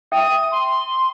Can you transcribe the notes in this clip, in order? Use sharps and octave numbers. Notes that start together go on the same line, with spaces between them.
E5 G5 D#6
C6